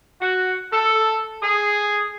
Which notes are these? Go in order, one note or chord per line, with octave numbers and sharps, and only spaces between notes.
F#4
A4
G#4